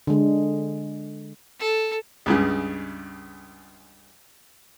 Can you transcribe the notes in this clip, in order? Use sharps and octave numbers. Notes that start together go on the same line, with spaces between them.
D3 G#3
A4
C#2 G2 C#3